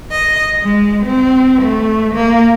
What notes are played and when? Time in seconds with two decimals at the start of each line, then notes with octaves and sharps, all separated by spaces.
0.12 D#5
0.62 G#3
1.06 C4
1.62 A3
2.13 A#3